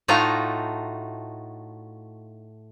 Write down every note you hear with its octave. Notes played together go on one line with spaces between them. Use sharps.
A2 A3 D#4 F4 F#4 A#5